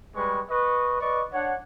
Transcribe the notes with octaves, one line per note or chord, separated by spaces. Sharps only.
G3 G#3 B4 C#6
B4 D#5 C#6
B4 D5 D#5 C#6
D4 C#5 F#5